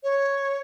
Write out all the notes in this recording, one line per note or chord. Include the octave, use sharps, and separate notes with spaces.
C#5